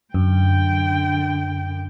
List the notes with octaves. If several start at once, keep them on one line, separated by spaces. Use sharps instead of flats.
F#2 D3 G5